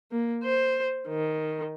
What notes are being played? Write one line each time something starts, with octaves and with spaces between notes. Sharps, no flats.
A#3
C5
D#3